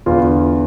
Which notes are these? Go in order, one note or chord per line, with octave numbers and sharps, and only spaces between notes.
E2 D3 F4